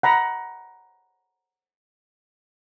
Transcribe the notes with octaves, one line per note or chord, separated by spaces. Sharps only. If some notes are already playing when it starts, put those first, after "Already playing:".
F#5 A#5 B5